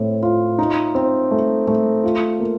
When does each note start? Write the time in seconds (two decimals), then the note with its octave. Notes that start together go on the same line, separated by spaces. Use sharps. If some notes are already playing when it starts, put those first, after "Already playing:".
Already playing: A2 A3 C4
0.23 F4
0.58 D#4
0.95 C4
1.31 A3
1.68 A3
2.04 F4
2.40 A#3